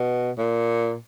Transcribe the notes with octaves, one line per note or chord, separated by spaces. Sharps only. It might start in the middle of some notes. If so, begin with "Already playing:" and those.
Already playing: B2
A#2